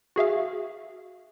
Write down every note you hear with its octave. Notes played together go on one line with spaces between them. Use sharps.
F#4 G#4 E5 F5